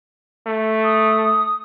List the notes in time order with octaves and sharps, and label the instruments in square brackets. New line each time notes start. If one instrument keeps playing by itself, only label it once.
[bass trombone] A3
[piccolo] D#6